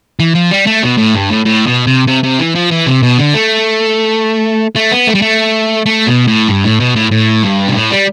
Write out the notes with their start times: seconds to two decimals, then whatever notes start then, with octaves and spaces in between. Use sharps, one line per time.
0.20 E3
0.35 F3
0.51 G3
0.67 A3
0.83 B2
0.98 A2
1.14 G2
1.30 A2
1.45 A2
1.67 B2
1.87 C3
2.08 C3
2.24 C3
2.39 E3
2.55 F3
2.71 E3
2.86 C3
3.03 B2
3.18 D3
3.34 A3
4.76 A3
4.91 B3
5.07 A3
5.15 G3
5.22 A3
5.86 A3
6.07 B2
6.28 A2
6.48 G2
6.64 A2
6.80 B2
6.96 A2
7.11 A2
7.43 G2
7.68 B2
7.74 A2
7.91 G3